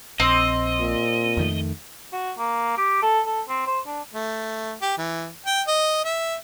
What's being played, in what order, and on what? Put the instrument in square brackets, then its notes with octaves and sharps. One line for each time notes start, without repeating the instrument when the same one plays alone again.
[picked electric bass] A#1 [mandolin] C4 [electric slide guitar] D#5
[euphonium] A#2
[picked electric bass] F2 D#3 A3
[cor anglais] F#4
A#3
G4
A4
A4
C4
C5
D4
[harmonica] A3
G4
E3
G5
D#5
E5